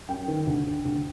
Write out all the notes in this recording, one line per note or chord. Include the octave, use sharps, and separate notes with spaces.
F#2 G5
D#3
D2
D3
D2